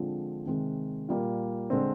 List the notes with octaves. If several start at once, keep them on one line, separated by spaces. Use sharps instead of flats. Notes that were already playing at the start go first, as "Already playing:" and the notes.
Already playing: D3 F3 G#3 C4
C3 D#3 G#3
A#2 G3 A#3
D3 G#3 C4